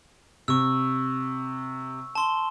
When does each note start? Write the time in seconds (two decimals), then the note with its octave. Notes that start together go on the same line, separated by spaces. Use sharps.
0.48 C3 C#6 E6
2.15 A5 C6 G7